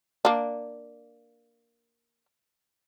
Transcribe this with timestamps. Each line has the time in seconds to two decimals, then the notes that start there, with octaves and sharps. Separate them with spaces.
0.25 A#3 D4